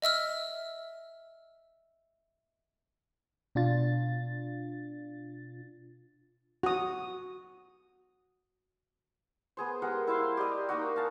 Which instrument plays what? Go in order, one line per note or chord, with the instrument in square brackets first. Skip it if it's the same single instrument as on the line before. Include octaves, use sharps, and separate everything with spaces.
[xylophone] D#5 E5 E6 F6
[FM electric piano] B2 D4 F4 A6
[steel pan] F#4 D#6
[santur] B3 G#4 C5
G#3 G4 A#4 F#5
E4 C5 F5 C6
G4 D5 D#5
A#3 D#4 F#4
F5 G#5 A5